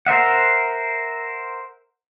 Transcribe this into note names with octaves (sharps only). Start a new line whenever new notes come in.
A#4 C5 E5 F#5